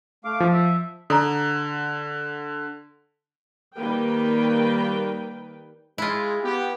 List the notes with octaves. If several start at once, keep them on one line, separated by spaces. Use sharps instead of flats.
A3 F5 D6
F3
E5
D3 A4 A#5
D#3 G3 A#3 B4 G5
G#3 E4 F4
B3 G4